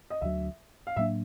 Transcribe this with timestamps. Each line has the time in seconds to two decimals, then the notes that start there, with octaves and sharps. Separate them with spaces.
0.10 D#5
0.21 D2 D3 F#3 E5
0.87 F5
0.96 A2 F#3 A#3 D4 E5